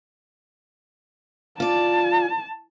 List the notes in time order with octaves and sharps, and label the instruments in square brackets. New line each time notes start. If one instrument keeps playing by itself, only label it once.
[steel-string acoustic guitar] F4 D5 [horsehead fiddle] A5